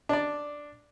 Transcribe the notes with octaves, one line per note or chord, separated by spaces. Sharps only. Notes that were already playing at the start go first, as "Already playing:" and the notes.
D4 D5